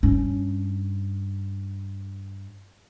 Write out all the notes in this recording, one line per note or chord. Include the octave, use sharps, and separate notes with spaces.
G2 C#4